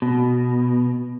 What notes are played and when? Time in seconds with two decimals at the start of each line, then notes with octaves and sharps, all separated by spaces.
0.02 B2